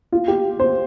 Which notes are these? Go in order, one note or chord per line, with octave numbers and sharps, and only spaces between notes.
F4
G4
C5